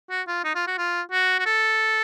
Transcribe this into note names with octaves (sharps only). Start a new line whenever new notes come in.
F#4
F4
D#4
F4
F#4
F4
F#4
F#4
A4